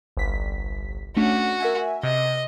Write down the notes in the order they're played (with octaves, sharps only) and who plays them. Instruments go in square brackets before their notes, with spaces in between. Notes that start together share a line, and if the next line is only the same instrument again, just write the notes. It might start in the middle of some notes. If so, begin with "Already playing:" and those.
[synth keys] G1 C2 B6
[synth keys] A3 C#4 D4 [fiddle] F#4
[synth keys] A#4 E5 G#5
[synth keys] C3 [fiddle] D#5